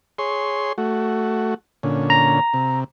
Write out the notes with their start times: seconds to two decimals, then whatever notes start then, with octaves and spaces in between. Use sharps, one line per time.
0.18 G#4 C#5 C6
0.78 A3 F#4
1.83 A#2 D3 C#4
2.10 A#5
2.54 C3